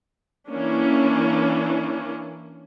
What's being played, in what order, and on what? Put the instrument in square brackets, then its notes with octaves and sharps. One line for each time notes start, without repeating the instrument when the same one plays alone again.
[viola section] E3 A#3 C#4 D4